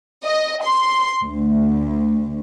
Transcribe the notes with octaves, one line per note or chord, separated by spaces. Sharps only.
D#5
C6
D2